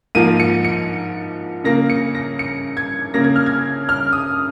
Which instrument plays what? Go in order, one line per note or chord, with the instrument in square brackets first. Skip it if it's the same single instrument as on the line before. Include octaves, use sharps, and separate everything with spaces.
[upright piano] G#2 F3 A#3 D#7
C#7
C#7
C#3 A#3 A#6
C#7
A#6
C#7
G#6
C#3 A#3 A#6
G#6
F6
G#6
F6
D#6